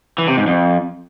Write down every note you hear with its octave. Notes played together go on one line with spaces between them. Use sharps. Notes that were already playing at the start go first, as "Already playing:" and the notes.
E3
C3
G#2
F2